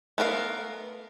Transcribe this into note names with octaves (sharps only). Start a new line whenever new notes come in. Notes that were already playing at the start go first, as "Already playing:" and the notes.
A3 B3 A#4 D5 F5